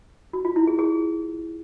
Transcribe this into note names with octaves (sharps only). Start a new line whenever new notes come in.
F#4
F4
E4
G#4
G#4